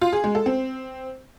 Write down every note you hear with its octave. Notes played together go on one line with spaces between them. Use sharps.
F4
G#4
G#3
A4
C4